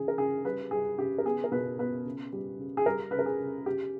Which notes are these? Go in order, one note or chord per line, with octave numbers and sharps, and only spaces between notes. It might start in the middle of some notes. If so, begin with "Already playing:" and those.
Already playing: C#3 E3 G#4
A#4
C#3 G#4
G3 B4
G3 G#4
C#3 G4
A#4
B3 G#4
A#4
B2 B4
B3 B4
C#3
G3
C#3
G#4
G3 A#4
C#3 B4
A#4
G#4
C#3
C#3 G4